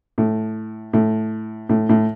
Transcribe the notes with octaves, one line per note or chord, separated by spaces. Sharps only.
A2
A2
A2
A2